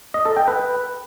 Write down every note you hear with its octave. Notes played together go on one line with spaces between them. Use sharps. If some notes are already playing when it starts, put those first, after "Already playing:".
D#5
A4
G5
B4